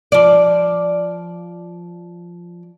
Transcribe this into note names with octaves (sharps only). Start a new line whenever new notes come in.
F3 D5